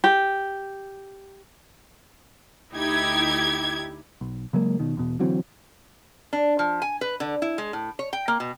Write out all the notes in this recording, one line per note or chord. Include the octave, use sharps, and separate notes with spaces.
G4
D2 D#4 E4 G4 G#6
B1
C#3 F#3 G#3 A#3
B2 D#3
E2 B2
D3 E3 F#3 C4
D4
F3
G#5
B4
D3
E4
G#3
A2
C#5
G5
A#3
B2